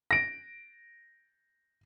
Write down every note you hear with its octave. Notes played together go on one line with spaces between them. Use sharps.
A#6 D7